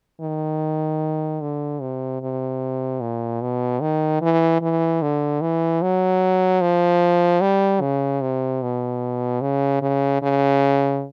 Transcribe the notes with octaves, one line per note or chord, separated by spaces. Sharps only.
D#3
D3
C3
C3
A#2
B2
D#3
E3
E3
D3
E3
F#3
F3
G3
C#3
C3
B2
C#3
C#3
C#3